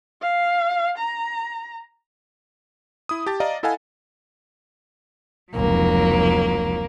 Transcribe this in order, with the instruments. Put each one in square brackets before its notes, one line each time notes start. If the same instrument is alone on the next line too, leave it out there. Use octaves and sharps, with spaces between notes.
[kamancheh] F5
A#5
[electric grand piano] E4 D#6
G4 A5 A6
D5 D#5 F5 A#5
E4 A4 D#5 F5 F#5 G#5
[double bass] F1 C#2 [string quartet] F#3 A#3